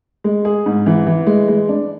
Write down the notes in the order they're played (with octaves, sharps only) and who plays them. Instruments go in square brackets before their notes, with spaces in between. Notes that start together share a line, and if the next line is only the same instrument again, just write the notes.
[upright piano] G#3
G#4
G#2
E3
E3
G#3
G#3
D4